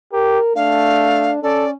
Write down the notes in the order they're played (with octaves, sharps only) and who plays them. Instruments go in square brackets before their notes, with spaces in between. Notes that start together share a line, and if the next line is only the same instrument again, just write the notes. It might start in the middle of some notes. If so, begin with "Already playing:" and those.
[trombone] G4 [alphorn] A#4
[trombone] A3 [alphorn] D4 [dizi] F5
[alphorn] C#4 [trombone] A4 [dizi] D5